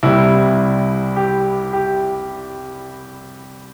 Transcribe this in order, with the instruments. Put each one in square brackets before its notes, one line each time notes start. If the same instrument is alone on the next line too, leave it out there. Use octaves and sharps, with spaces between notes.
[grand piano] C2 C3 G3 E4
G4
G4